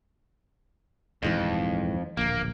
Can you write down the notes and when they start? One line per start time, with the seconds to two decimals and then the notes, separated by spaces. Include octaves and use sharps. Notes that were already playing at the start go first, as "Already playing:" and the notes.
1.23 D#1 F2 G#2 E3
2.17 D1 A#1 A#3